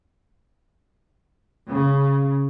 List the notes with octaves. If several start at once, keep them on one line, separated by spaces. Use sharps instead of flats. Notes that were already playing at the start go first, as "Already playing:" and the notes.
C#3